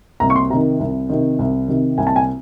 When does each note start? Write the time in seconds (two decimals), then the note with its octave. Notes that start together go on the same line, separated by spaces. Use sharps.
0.20 C2 A#5
0.30 C#6
0.36 C6
0.50 C3 A#5
0.54 D#3
0.79 C2
1.09 C3 D#3
1.39 C2
1.68 C3 D#3
1.98 C2 G#5
2.07 A5
2.16 G#5